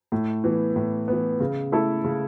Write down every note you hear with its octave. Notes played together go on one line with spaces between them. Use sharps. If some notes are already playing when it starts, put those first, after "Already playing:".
A2
E3 B3
A2
E3 B3
C#3
A3 E4 A4
C#3